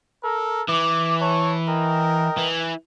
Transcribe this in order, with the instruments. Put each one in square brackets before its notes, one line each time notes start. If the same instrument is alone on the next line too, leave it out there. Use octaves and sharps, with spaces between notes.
[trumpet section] A4 A#4
[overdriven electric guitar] E3 [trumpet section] D6
[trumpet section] C#5 A5 C#6
A#4 D#5 G5
[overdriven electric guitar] E3